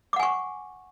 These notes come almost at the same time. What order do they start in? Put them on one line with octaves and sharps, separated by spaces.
D6 F#5 G#5 C#6